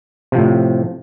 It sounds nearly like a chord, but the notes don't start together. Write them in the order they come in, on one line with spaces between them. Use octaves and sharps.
C3 F3 A2